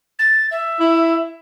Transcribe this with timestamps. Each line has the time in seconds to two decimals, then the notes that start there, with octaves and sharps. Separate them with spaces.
0.19 A6
0.51 E5
0.80 E4